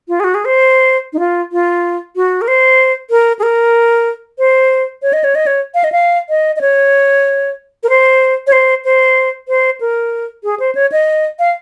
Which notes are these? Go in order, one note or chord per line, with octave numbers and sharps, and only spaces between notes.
F4
G#4
F#4
G#4
C5
D#4
F4
F4
F#4
A#4
C5
A#4
G#4
A#4
C5
C#5
D#5
C#5
D#5
C#5
F5
D#5
F5
D#5
D#5
C#5
A#4
C5
C#5
C5
C5
C5
A#4
G#4
C5
C#5
D#5
F5